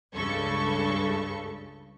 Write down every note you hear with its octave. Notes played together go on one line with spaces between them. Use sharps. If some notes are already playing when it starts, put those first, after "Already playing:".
C#2 G2 C#3 A4 C#6